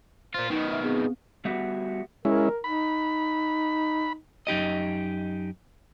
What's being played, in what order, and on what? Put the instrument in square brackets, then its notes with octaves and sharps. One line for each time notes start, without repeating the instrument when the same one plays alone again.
[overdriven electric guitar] A#2 F4 [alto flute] C5
[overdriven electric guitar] B2 D#3 [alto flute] D#4
[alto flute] E5
[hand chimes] B3 C4 [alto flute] G#4
[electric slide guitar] G3 B3 F#4 G4 E5
[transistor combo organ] G#3 C#4 E4 [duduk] A#4
[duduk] D#4 [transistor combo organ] B5
[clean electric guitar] F#2 D#4 G4 D#5